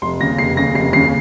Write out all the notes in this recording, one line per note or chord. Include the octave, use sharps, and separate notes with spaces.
F1 C6
D#2 C#3 A#6
F1 C7
D#2 C#3 A#6
F1 C7
D#2 C#3 C7